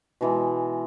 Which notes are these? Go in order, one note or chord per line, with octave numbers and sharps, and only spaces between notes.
B2 E3 G#3